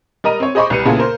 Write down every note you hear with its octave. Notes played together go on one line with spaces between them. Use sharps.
G3 A#4 D#5 A#5 D#7
C4 C#5
G#4 C5 D#5 B5 C#6 D6
C2 G3 B4 C#7 D#7
A#2 C#3 B3 E4 G#4 A4
A#4 C5